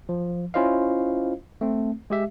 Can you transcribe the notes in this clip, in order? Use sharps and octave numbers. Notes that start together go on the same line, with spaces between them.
F3
C#4 E4 F4 C5 D#5 F5
A3 C4
G#3 G4 E5